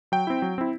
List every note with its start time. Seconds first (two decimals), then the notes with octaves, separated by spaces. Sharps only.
0.12 F#3 G5
0.27 C4 E4
0.42 F#3
0.58 C4 E4